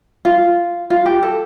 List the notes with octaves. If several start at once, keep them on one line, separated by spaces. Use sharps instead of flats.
F4
F4
G4
A4